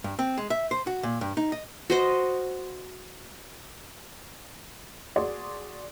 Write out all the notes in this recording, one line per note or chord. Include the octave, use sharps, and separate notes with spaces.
G2
C4
G#3
E5
C5
F#4
A#2
G2
D#4
D#5
F#4 C5 D#5
F#4 G#4 D5 C6